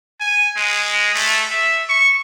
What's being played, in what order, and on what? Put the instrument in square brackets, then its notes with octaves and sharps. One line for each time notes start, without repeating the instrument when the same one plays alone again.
[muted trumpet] G#5
G#3
A3
E5
C#6